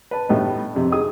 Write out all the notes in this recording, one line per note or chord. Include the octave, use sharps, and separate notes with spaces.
B4 A5
A2 G3 A3 B3 D#4
F2 C3
D#4 G4 G#4 D#6